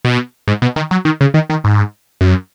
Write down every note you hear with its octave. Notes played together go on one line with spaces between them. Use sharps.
B2
G#2
B2
D#3
F#3
D#3
C#3
D#3
D#3
G#2
F#2